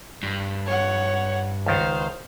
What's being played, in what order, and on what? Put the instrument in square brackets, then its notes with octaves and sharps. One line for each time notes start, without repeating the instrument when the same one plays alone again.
[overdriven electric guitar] G2
[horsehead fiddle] C#5 F#5
[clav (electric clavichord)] C#2 D#3 [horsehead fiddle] C5 F5